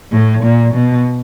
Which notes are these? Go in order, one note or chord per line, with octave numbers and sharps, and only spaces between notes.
A2
A#2
B2